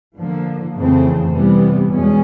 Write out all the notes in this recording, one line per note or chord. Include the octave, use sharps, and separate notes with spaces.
D3 F3 A#3
F2 C#3 E3 A3 C4
C3 E3 G3 B3
E2 B2 G#3 C#4